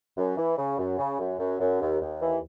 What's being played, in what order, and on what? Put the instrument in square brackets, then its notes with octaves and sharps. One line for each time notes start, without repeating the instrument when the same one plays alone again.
[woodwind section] F#2
E3
C#3
F#2
C#3
F#2
F#2
F#2
D#2
D#2
E3